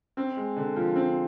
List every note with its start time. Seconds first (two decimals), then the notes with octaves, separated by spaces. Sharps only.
0.17 C4
0.37 G#3
0.56 D3
0.76 F3
0.96 C4